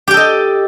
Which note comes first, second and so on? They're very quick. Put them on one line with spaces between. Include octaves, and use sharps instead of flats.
G4 G5 A4 D#5